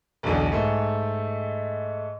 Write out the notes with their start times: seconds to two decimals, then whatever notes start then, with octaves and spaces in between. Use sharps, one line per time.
0.23 B1 E2 D3
0.52 G#2 A3